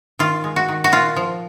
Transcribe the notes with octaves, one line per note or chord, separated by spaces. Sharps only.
D#3 F4
G#3
F#4
D#3
F#4
A#2 F4
F3